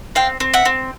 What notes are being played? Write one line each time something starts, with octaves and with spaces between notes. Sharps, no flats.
C4 F5 G5
C4
E5 F#5
C4